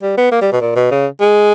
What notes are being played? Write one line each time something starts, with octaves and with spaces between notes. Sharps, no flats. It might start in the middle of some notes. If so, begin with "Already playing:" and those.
G3
B3
A#3
G3
B2
A#2
B2
C#3
G#3